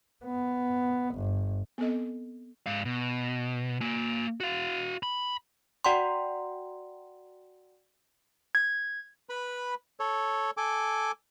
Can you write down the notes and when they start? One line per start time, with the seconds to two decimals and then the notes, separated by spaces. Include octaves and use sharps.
0.24 B3
1.15 G1
1.78 B3 C4 A4 D#5
2.66 G#2 F5
2.85 B2
3.81 A#3 G#5
4.40 F#4 F5
5.03 B5
5.85 F#4 D5 F#5 G5 A#5 C6
8.55 G#6
9.29 B4 B5
10.00 A4 C#5
10.57 A4 G#5 D6